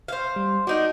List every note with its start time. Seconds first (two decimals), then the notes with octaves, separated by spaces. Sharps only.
0.08 C5 F5
0.36 G3
0.67 D4 D#4 F#4 A#4